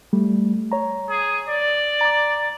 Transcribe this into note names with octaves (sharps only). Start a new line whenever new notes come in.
G3 A3
C#5 A#5
G#4
D5
A#5 D6